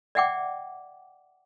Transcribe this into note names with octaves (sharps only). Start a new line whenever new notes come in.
D5 E5 F#5 G5 D6